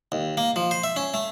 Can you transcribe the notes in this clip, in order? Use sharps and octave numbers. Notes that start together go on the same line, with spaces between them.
D#2
A#3
F3
C5
E5
C#4
A3